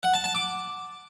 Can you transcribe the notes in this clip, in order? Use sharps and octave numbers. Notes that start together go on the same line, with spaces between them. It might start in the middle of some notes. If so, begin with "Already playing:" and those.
F#5
A5
A5
D6